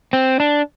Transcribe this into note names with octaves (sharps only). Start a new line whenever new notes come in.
C4
D4